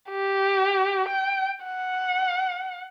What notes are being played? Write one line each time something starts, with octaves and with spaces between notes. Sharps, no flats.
G4
G5
F#5